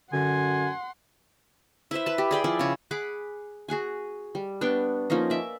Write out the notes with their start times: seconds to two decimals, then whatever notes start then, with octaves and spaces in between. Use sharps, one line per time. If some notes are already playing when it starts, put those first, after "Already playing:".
0.13 F#2 D3 F#5 G#5 C6
1.91 E4 B4 C5 E5
2.06 B4 A5
2.18 G4
2.31 G#4 D5 G5
2.44 F3 E4 D5
2.59 C#3 C#5
2.91 G#4 F#5 B5 D6
3.69 F#4 G#4 F#5 G#5
4.35 G3
4.61 B3 D4 G5 C#6
5.10 F3 A#3 C#4 D#4
5.30 D5 E5